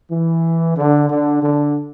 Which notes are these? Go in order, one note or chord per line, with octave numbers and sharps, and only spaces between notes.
E3
D3
D3
D3